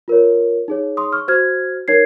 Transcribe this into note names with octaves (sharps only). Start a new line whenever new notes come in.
F4 A#4 C#5
D#4 G#4 C#5
C6 D#6
C#6 F6
F#4 C5 F6 G#6
D#4 A#4 C#5 G#6 C7